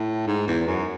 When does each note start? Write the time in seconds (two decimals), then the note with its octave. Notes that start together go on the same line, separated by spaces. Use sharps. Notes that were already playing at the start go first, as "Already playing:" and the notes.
Already playing: A2
0.27 G#2
0.48 E2
0.67 F#2